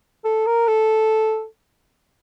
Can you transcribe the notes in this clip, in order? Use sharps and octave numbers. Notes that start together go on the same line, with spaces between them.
A4
A#4
A4